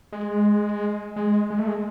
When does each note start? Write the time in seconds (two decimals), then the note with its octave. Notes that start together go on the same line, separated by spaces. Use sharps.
0.12 G#3
1.16 G#3
1.50 G#3
1.59 A3
1.67 G#3